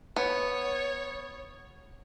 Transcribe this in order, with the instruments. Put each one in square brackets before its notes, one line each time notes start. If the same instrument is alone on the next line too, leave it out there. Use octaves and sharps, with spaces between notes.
[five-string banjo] B3 [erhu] C#5